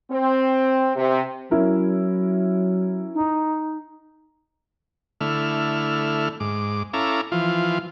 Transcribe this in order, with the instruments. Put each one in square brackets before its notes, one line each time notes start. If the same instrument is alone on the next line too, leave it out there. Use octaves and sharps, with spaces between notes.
[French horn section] C4
C3
[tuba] F#3 [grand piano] C#4 E4 A#4
[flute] D#4
[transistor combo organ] D3 A3 E4 F6
G#2 D6
C#4 E4 A4 F5 A#5 D6
E3 F3 F4